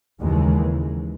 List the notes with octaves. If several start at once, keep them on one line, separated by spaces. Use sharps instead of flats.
D#2 C#3 E3 G#3